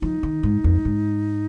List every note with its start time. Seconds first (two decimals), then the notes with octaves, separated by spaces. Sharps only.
0.01 F3 D#4
0.23 D#3
0.43 G#2
0.64 F2
0.85 G#2